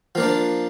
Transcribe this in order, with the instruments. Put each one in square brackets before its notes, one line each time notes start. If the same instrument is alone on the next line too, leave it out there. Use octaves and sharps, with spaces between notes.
[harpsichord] F3 A#3 D4